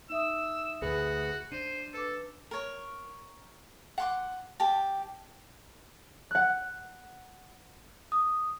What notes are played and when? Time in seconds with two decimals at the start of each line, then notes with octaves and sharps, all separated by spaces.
0.10 D#4 E5 D#6 E6
0.82 D2 F#4 G#4 B4
1.52 D4 C5 D#7
1.94 A4 B4 D6
2.51 A#4 C#5
3.98 F#5 C6 D6
4.60 G4 A5
6.31 F#5 F#6
8.12 D#6